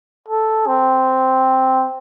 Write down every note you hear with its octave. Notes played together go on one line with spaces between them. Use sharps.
A4
C4